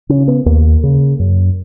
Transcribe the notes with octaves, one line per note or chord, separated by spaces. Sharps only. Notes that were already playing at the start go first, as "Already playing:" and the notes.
C#3 C#4
B3
D#2 A#3
C#3
F#2